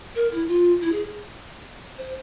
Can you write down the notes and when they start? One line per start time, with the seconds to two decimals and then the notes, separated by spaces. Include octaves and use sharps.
0.15 A#4
0.32 E4
0.48 F4
0.82 E4
0.92 G#4
1.98 C5